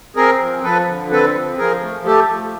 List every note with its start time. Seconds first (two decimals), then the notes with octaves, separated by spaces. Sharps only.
0.16 C4 G#4 A#4
0.41 F3
0.64 F3 A4 B4
0.88 D3
1.11 C4 A4 B4
1.35 F3
1.58 F3 G#4 A#4
1.82 A3
2.06 A3 G4 A4
2.29 F3